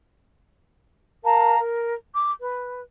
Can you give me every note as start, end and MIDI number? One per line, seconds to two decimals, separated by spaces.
1.24 1.58 70
1.24 1.58 77
1.24 1.58 81
1.24 1.58 82
1.60 1.93 70
2.14 2.30 86
2.41 2.80 71